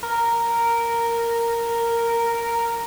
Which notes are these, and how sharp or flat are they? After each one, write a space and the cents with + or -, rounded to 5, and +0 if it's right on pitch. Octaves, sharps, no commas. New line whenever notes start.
A#4 -5